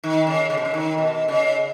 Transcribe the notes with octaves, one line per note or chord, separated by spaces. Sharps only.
D#3
C#3
C#3
B2
C#3
D#3
B2
C#3